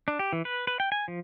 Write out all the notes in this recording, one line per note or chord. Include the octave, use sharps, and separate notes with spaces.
D4
G4
E3
B4
B4
G5
G#5
F3